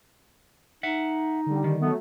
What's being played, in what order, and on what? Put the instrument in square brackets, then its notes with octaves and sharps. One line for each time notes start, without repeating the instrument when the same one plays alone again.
[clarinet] D#4 [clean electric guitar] E5 F#5
[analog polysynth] D3 G3
[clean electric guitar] D#3
[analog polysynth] F#3 A3 [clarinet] B3